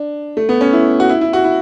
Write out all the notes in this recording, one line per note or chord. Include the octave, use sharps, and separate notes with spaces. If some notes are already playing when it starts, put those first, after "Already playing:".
Already playing: D4
A3
B3
C#4
E4
F#4
E4
E4
F#4
E4